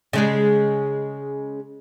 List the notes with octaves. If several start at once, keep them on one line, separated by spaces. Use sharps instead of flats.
C#3 G#3 G#4